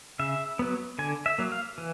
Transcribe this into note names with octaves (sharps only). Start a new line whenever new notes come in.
C#3 E5
F#3 B3
D3 G#5
E5
F#3 A#3
F5
E3